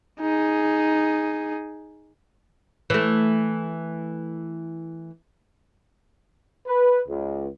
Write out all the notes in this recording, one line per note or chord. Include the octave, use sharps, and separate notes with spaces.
D#4 G#4
E3 A3
B4
C#2